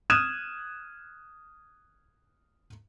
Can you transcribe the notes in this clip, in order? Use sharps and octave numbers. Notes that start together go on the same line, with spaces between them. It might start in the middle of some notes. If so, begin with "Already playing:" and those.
D#6 F6 F#6 G#6 D#7 E7